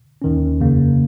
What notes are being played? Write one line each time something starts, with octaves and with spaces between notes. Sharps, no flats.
D#2 D#3 C#4
F2 C#3 A#3